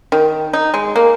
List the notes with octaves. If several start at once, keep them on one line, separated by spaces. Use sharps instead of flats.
D#3
D#4
G#3
A#3